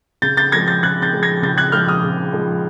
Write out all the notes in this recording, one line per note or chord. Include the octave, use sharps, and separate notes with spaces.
C#3 G6 A6
G6 A6
F3 G#3 G#6 A#6
G6 A6
C#3 F#6 G#6
G6 A6
F3 G#3
G#6 A#6
C#3 G6 A6
F#6 G#6
F3 G#3 F6 G6
D#6 F6
C#3
F3 G#3